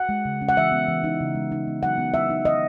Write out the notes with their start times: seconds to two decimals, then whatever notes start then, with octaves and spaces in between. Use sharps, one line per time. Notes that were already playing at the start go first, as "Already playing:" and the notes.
Already playing: F#5
0.09 G#3
0.25 C#3
0.41 C#4
0.49 F#5
0.57 E3 E5
0.72 B3
0.88 E3
1.04 D#4
1.20 C#3
1.35 G#3
1.52 D#4
1.67 B3
1.83 F#3 F#5
1.98 B3
2.14 F#3 E5
2.30 D#4
2.45 D#3 D#5